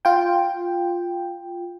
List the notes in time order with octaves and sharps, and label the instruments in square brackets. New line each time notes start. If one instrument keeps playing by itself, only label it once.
[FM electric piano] F4 G5